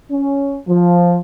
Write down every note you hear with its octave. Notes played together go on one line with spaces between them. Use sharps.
C#4
F3